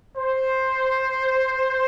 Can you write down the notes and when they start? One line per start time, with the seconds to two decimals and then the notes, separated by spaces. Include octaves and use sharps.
0.17 C5